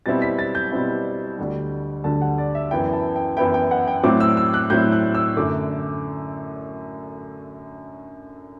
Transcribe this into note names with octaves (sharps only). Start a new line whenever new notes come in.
B2 G3 C4 E4 A6
B6
A6
G6
B2 G3 C4 E4
D2 D3 G3
D2 D3 G3 A5
F#5
D5
E5
F#2 E3 B3 E4 G5
A5
G5
F#2 E3 B3 E4 G5
G5
F#5
G5
A2 F#3 C4 E4 D6
E6
E6
F#6
A2 F#3 C4 E4 G6
F#6
E6
F#2 D3 A3 D6